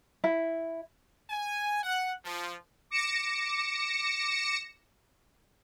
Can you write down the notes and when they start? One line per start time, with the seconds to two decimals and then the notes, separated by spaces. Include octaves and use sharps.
0.24 E4
1.29 G#5
1.83 F#5
2.24 F3
2.91 D6 A#6 C#7 E7